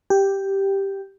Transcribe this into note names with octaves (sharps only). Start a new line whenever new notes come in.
G4